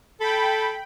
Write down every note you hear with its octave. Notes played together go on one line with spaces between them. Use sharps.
A4 G5 B5